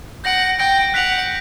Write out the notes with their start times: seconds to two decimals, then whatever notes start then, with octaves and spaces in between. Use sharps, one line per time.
0.24 F#5 G6 A#6 D7
0.59 G5 G6 A#6 D7
0.94 F#5 F#6 B6 D7 F7